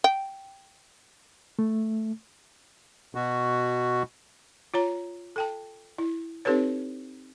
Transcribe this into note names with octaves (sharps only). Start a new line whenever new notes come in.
G5
A3
B2 F#4
F4 C#5 A#5
A4 G5 A5
E4
C4 D#4 G4 A4 B4 C#5